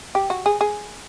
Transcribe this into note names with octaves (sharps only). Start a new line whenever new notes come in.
G4
F#4
G#4
G#4